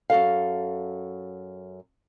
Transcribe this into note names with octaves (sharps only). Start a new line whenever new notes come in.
F#2 F#4 A4 F5